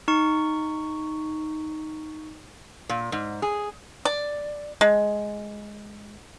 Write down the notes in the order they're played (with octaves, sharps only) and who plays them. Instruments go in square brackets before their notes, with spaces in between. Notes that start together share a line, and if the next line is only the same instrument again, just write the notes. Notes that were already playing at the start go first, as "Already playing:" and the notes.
[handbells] D#4 C#6
[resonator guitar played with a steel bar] A#2
G#2
G#4
[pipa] D5
G#3